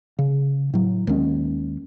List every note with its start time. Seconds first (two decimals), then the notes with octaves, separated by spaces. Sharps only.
0.19 C#3
0.74 A2 F#3
1.07 D#2 D#3 G#3 C#4